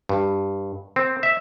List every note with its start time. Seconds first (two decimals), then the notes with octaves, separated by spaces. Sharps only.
0.09 G2
0.96 C4
1.23 E5